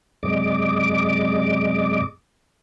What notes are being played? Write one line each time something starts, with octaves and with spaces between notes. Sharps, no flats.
F#2 C3 G#3 D5 D#5 D6